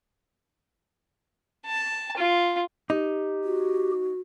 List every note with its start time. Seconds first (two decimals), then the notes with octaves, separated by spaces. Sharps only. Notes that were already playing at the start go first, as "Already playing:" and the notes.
1.66 A5
2.17 F4
2.90 D#4 G4
3.44 F#4